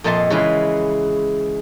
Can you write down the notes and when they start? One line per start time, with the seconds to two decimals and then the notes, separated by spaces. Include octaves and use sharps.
0.04 F2 A#2 D#5 E5 A5 C6
0.30 C#3 E3 G#3 B4